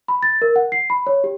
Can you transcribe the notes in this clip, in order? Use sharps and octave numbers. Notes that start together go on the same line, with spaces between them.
B5
A6
A#4
F#5
C7
B5
C#5
G4